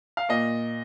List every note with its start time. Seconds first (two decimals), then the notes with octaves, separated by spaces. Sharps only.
0.17 F5
0.29 A#2 D#5